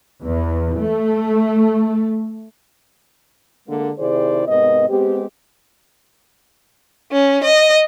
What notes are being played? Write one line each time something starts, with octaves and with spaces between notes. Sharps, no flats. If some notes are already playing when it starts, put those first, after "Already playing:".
E2
A3
D3 G#3 A#3
C3 D#3 E4 G#4 C5 D5
G#2 C3 B3 A#4 D#5
G#3 B3 C4 G4
C#4
D#5